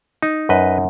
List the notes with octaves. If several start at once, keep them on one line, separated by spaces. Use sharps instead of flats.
D#4
F#2 B4 D#5